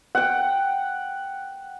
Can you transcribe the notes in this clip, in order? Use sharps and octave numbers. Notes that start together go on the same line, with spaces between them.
F#5 G5